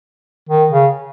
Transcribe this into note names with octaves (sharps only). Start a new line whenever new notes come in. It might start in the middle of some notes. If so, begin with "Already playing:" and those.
D#3
C#3